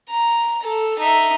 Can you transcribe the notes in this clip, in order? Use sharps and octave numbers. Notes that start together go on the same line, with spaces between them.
A#5
A4
D#4 E5